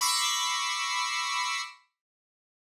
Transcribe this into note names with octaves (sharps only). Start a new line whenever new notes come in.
B5 C#6 D6 E6 A#6 C7